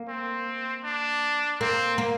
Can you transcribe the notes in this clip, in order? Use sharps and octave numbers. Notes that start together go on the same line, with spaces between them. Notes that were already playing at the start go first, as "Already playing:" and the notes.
Already playing: A#3
C4
D4
A#3 C4
A#3